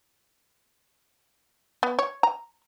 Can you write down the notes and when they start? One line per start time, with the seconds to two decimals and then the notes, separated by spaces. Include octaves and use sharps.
1.83 B3
1.99 C#5
2.23 A#5